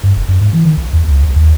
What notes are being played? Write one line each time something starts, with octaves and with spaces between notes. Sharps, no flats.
G2
F1
F#2
G#2
E3
D#3
B1
E2
C#2
C2
D#2